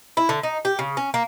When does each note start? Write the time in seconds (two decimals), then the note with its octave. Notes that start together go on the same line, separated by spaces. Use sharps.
0.17 E4
0.29 D3
0.43 D#4
0.65 G4
0.79 C#3
0.97 C#4
1.14 A#3